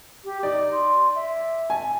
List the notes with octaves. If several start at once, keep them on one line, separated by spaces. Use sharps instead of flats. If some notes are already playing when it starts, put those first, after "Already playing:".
G4
D#4 D5
C6
E5
G#5 A5